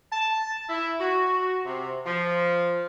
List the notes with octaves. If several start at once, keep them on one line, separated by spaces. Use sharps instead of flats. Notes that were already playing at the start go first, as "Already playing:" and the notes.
A5
E4
F#4
C3
F3